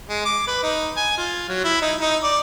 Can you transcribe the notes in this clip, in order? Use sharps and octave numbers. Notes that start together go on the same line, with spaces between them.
G#3
D6
B4
D#4
G#5
F4
F#3
E4
D#4
D#4
D5